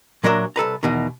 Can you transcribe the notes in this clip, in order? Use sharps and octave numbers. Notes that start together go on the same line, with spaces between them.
A#2 F#3 D4 A#4 B4 E5
C2 A4 B4 A#5
E2 B2 D#3